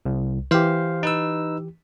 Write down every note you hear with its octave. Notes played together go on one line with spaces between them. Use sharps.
C2
E3 G4 C5 F5
D#4 B4 E6